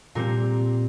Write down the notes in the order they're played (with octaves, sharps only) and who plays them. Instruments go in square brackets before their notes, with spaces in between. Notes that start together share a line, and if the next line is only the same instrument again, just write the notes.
[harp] A#2 G3 C4 A#4